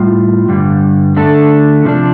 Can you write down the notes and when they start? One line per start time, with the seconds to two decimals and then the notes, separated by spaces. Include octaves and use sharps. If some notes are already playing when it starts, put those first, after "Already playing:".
Already playing: A2 G3 F4
0.49 G2 D3 G3
1.16 D3 A3 D4 A4
1.85 C3 F3 D4